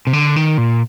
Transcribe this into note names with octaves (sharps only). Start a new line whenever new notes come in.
C3
D3
D#3
A#2